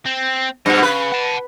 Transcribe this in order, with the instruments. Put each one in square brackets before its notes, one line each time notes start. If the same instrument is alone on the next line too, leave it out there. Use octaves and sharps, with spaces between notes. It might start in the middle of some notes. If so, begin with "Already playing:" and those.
[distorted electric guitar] C4
[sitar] G2 B2 [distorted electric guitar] D#5 F#5
[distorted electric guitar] C#3 [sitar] B4
[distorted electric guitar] F#5 A5